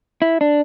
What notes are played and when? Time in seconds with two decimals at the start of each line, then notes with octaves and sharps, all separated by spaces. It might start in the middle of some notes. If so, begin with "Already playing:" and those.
0.22 E4
0.41 D4